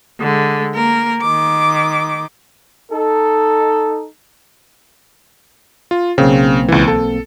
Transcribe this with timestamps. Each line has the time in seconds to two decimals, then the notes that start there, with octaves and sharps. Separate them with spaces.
0.20 D3 G#3
0.75 A#3 A#4
1.22 D#3 D6
2.91 D#4 A4
5.91 F4
6.18 B1 C#3 A#3 C4
6.68 C#2 E3
6.88 A4